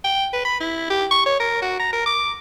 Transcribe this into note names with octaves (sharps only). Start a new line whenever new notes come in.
G5
B4
B5
E4
G4
C#6
C#5
A#4
F#4
A#5
A#4
D6